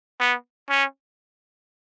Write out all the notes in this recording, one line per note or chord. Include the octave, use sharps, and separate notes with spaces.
B3
C#4